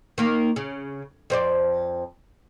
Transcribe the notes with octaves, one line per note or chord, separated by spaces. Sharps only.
D#3 A#3
C#3
F2 C5 D5